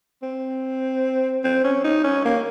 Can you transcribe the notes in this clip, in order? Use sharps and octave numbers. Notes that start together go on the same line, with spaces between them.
C4
C4
C#4
D#4
C#4
A#3